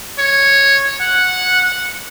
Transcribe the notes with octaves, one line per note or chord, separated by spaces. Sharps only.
C#5
F#5